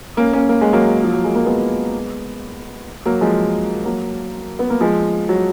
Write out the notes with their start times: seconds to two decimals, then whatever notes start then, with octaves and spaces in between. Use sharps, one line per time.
0.17 A#3 C#4
0.33 A#3 C#4
0.49 A#3
0.61 G#3
0.73 F#3 A#3
1.03 F3
1.14 F#3
1.24 G#3
1.35 A#3
1.46 G#3 B3
3.06 F#3 A#3
3.21 F3 G#3
3.85 F#3 A#3
4.59 B3
4.70 A#3
4.80 F3 G#3
5.29 F#3